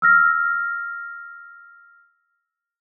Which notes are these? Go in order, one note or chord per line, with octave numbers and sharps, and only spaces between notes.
E6 F6 A#6